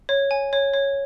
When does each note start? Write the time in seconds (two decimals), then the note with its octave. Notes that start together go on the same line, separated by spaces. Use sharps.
0.09 C#5
0.31 G#5
0.53 C#5
0.74 C#5